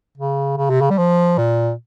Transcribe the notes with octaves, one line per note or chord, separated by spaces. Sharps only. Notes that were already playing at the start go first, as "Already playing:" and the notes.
C#3
C#3
C3
C#3
G3
F3
A#2